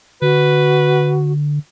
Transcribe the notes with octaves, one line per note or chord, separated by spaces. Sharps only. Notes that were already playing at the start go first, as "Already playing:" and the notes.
D3 F#4 B4